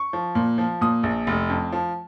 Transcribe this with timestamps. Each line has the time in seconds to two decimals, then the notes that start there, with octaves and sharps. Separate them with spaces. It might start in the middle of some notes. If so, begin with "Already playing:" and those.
Already playing: C#6
0.13 F3
0.35 A#2
0.58 F3
0.81 A#2 D#6
1.03 A#1
1.27 F1
1.50 F2
1.72 F3